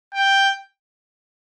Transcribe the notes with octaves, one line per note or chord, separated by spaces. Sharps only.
G5